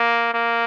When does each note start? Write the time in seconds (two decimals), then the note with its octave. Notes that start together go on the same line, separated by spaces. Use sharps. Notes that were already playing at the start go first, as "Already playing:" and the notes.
Already playing: A#3
0.34 A#3